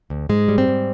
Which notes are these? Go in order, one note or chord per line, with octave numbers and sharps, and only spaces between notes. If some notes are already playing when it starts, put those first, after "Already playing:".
D2
G#2 G#3
G3
C4
G#2